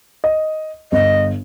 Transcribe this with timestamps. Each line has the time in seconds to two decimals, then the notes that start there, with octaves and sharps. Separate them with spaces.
0.24 D#5
0.92 G1 D#5